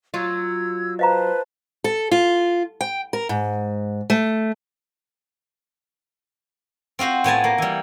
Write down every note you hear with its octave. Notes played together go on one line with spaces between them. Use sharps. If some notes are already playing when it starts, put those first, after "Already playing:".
F#3 F4 E6 G#6
B4 C5 D#5 F5 A5 A#5
A4
F4
G5
A#4
G#2
A3
C4 F4 F#4 C5
A2 B3 G#5 A5
A#3
E3 G3